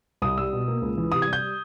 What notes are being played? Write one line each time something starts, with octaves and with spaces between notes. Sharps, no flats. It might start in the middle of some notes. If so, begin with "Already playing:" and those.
C2 D#6
G3 E6
B2
A#3
C#2
E3
C3 D#6
G#6
G3
G6